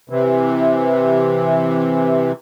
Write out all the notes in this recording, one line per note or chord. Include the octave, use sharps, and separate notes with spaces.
C3 E3